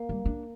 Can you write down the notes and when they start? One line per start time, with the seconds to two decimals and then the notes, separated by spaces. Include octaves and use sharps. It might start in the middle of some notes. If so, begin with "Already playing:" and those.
Already playing: A#3
0.09 G3
0.26 D4